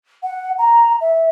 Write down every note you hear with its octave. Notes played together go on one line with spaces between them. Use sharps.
F#5
A#5
E5